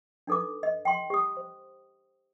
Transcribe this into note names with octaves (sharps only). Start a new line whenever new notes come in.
D4 D#4 A4 B4 D6
D#5
G5 G#5 C6
G4 D#6
C5